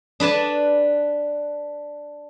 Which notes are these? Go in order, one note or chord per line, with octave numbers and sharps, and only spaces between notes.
D4 B4 D5 A5